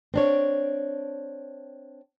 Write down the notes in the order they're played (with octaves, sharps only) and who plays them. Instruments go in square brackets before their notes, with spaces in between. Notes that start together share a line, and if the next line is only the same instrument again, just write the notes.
[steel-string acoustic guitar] C4 D4 C#5